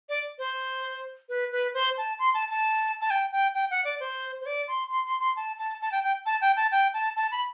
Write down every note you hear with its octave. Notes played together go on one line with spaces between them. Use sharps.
D5
C5
B4
B4
C5
A5
C6
A5
A5
A5
G5
G5
G5
F#5
D5
C5
C5
D5
C6
C6
C6
C6
A5
A5
A5
G5
G5
A5
G5
A5
G5
A5
A5
B5